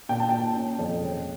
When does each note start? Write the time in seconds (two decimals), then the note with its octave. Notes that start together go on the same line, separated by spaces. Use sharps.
0.09 A#2 G5
0.20 A5
0.29 A#2 G5
0.56 C#4
0.79 F2
1.02 C#3